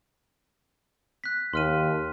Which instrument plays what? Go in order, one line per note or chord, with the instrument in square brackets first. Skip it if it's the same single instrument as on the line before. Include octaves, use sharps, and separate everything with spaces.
[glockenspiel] F#6 B6
[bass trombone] D#2 [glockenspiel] C6 F6 D#7